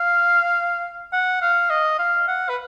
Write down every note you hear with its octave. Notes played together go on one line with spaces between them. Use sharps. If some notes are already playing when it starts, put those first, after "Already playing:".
Already playing: F5
F#5
F5
D#5
F5
F#5
B4